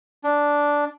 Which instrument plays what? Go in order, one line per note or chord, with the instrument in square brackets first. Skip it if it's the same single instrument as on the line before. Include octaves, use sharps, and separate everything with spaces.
[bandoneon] D4